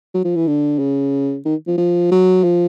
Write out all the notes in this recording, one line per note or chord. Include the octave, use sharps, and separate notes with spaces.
F#3
F3
E3
D3
C#3
D#3
F3
F3
F#3
F3